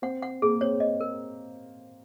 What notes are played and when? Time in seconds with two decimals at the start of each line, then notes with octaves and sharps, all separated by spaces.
0.02 C4 F#5
0.23 F#5
0.42 A#3 G#4
0.61 C4 C#5
0.80 D#5
1.01 A#4